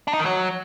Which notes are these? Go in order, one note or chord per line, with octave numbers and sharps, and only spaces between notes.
D4
D#4
D#3
F#3